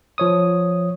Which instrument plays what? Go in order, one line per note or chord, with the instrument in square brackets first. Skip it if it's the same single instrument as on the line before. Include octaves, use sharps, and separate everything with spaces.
[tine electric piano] F3 C#5 D#6